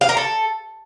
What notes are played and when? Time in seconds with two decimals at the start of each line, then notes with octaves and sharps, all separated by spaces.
0.01 F5
0.09 A#4
0.17 A4